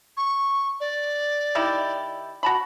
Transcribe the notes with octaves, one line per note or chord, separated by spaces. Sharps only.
C#6
D5
D#3 E4 G4
F#4 A5 B5